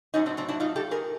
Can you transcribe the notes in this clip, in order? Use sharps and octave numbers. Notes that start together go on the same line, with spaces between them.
A2 F#3 C#4 D#4
C4 D4
C4 D4
D4 E4
D#4 F4
G4 A4
G#4 A#4